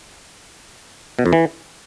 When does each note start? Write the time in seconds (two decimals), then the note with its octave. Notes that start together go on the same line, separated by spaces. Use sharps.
1.19 B2
1.26 F2
1.33 E3